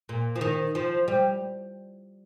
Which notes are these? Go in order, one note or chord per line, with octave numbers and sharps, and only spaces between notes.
A#2
F3
D#3
F3
G3